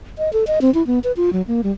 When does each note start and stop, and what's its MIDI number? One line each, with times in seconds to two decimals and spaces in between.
0.18 0.32 75
0.33 0.44 69
0.47 0.59 75
0.61 0.73 60
0.74 0.85 64
0.87 0.99 59
1.04 1.12 71
1.17 1.30 65
1.33 1.42 54
1.47 1.61 58
1.64 1.71 55